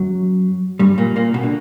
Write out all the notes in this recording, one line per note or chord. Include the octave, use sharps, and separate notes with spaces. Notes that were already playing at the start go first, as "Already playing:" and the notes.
Already playing: F#2 F#3
G2 G3
A#2 A#3
A#2 A#3
B2
D3